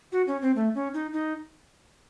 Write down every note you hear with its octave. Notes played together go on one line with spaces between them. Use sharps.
F#4
C#4
C4
A3
C#4
D#4
D#4